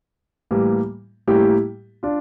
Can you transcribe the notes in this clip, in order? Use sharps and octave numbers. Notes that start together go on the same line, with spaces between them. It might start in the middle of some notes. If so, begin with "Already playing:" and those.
A2 E3 G3 A#3
A2 G3 A#3 E4 G4
D4 F4